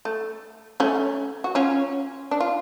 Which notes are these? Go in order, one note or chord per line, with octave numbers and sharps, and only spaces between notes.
A3
A3 C#4
F#4
C#4 F4
D4
F4